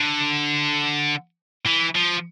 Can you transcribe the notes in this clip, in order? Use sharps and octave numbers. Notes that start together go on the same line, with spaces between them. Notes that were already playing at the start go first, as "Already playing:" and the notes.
Already playing: D3
E3
F3